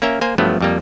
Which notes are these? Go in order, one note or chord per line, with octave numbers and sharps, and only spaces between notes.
A#3 C#4 A#4 E5
A#3 C5 G#5
G2 F3 F#3 A3 B3
F2 G3 A#3